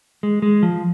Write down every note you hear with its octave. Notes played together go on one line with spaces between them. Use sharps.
G#3
G#3
F3